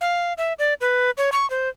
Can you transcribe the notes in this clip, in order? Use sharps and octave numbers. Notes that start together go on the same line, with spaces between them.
F5
E5
D5
B4
C#5
C#6
C5